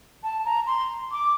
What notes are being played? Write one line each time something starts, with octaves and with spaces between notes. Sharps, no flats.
A5
A#5
C6
D6